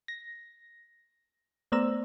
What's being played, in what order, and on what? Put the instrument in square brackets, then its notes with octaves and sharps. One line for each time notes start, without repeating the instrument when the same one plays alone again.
[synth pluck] A#6
A3 B3 C5 D5 A#5 E6